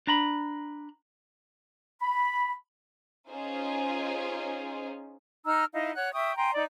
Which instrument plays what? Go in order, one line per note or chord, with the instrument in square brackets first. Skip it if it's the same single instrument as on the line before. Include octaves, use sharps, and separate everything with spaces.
[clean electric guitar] D4 A#5 B5
[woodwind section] B5
[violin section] C#4 D#4 F4 G#4 C5
[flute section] D#4 A#5 E6 F6
D#4 E4 D#5 F5
C#5 F#5 F#6
E5 G5 C#6 D#6
G5 G#5 A#5 C6
D#4 D5